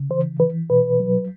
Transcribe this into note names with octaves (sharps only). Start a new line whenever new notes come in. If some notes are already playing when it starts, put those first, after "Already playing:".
Already playing: C#3
E3 C5
E3 B4
B2 B4
F#3